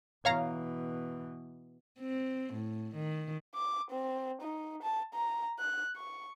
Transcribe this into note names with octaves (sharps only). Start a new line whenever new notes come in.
B2 E3 C#5 F5 A#5
C4
A2
D#3
D6
C4
D#4
A5
A#5
F#6
C#6